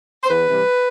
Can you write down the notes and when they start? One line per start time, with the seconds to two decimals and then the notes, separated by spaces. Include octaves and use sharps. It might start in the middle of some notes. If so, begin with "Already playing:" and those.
0.24 C5
0.29 E2 B4
0.47 C3 E3 G3